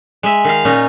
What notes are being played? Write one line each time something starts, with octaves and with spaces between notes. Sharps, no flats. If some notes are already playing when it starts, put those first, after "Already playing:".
G#3 E5
D#3 F5
A#2 C#4 D#4